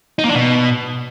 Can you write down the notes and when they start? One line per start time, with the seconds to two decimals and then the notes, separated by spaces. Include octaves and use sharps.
0.19 D#4
0.24 A#3
0.29 D4
0.35 B2